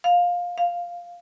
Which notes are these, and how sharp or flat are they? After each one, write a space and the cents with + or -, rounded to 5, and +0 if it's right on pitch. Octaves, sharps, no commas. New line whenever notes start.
F5 +15
F5 +0